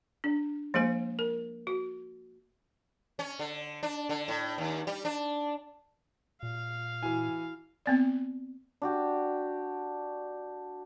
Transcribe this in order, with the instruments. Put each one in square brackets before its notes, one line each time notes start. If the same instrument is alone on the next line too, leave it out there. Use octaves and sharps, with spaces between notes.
[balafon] D4
F3 G#3 A#3 C5 G#5
A#4
F#4
[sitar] C#4
D3
D4
D3
A2
D#2
G3
D4
[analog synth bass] A#2 [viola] F5
[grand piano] E3 G#5 [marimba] E4 F#4
[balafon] B3 C4 D5
[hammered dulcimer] D4 F#4 G4